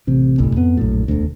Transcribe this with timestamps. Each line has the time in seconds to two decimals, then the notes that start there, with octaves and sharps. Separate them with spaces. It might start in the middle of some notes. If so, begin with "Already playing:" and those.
0.07 A1 C3
0.38 D1 G1 C2 A2
0.56 F2 B3
0.77 A#1 F#2 A2
1.08 E1 D2